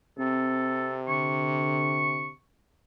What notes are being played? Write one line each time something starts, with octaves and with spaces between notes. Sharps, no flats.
C3 C4 A4
D3 C#6